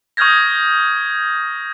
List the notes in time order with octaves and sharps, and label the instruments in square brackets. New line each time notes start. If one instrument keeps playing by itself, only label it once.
[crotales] C#6 D#6 F6 G6 G#6 A#6